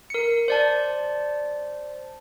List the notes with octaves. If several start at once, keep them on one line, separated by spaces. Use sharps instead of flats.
A#4 C#7
C5 D5 A5